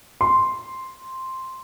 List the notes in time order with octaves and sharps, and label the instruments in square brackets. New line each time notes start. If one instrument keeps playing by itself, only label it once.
[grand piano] C6